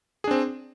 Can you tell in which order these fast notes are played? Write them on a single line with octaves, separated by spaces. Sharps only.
G#4 D4 C4